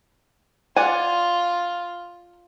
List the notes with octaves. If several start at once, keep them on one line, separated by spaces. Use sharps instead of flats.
F4 D5 F#5 G#5